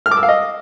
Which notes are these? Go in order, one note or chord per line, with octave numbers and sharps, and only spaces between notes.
F6
D6
E6
F5
D#5